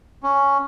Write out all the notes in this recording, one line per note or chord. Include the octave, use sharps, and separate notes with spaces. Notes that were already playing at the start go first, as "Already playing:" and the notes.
C#4